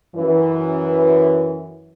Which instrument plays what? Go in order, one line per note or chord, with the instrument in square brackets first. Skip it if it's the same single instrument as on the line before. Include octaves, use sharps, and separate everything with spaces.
[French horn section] F#2 E3